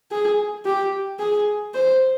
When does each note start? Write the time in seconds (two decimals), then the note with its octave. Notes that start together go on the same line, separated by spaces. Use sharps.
0.11 G#4
0.65 G4
1.19 G#4
1.74 C5